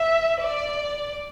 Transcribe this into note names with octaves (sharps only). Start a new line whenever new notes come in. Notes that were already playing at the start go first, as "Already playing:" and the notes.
Already playing: E5
D5